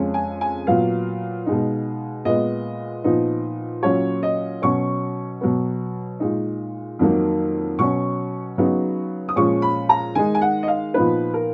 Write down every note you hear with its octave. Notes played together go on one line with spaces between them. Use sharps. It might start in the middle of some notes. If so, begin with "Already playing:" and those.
Already playing: F2 C#3 G#3 C#4
G#5
G#5
A#2 F#3 B3 F5
B2 G#3 D#4
A#2 G#3 B3 D#5
A#2 F3 B3 D#4
A#2 F#3 C#4 C#5
D#5
B2 F#3 C#4 C#6
B2 F#3 B3
A#2 G#3 D#4
F2 D#3 F#3 A#3
B2 F#3 C#4 C#6
C#3 F#3 B3 D#4
D#6
A#2 F3 G#3 C#4 C#6
B5
A#5
D#3 G#3 D#4 G#5
G#5
F#5
D#5
F5
A#2 F3 B3 D#4 B4
A#4